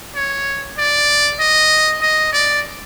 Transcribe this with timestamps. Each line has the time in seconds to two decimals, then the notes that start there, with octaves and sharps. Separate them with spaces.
0.16 C#5
0.78 D5
1.40 D#5
2.02 D#5
2.33 D5